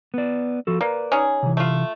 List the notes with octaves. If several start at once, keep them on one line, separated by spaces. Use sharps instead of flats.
B3 D5
F3 F#4 A4
A#3 B4 D5
C#4 D#4 G#4
C3 E3
A3 F4